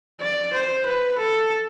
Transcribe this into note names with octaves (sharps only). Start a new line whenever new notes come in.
D5
C5
B4
A4